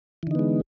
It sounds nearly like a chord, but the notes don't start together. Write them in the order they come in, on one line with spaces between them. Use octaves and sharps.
E3 D3 D#4 B3 G#3